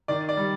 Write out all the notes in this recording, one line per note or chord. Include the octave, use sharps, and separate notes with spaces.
D#3 D5
D5
G3